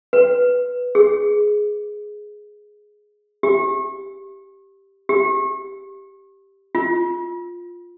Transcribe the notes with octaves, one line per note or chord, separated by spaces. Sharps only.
B4
G#4
G4
G4
F4